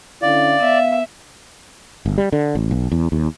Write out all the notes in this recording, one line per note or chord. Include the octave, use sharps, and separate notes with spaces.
D3 C#4 E4 D5 F5
B3 E5
G1
G3
D3
A1
B1
E2
D#2